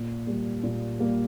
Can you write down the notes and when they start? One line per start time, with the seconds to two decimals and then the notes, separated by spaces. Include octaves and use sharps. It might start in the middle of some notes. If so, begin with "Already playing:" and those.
Already playing: A#2
0.27 G3 A#3
0.64 A#2
0.99 G3 A#3